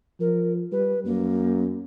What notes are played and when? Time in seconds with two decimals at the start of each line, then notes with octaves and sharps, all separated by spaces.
0.20 F3 A#4
0.72 G3 B4
1.05 F#2 A#3